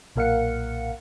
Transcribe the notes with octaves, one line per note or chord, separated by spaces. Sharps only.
B1 A#2 A#4 F5 F#5 C#7